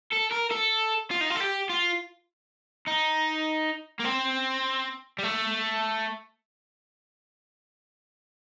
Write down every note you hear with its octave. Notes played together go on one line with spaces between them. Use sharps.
A4
A#4
A4
F4
D#4
F4
A4
G4
F4
D#4
A#3
C4
G3
A3